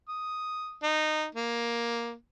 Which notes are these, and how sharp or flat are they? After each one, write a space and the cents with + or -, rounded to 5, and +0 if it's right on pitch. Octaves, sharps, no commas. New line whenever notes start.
D#6 +0
D#4 -15
A#3 +10